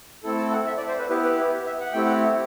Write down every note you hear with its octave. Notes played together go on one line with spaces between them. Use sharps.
A3 C4 E4 A4
A5
F#5
E5
D5
C5
B4
B3 E4 G4 B4
B4
B4
E5
F#5
A3 C4 E4 G4 G5
F#5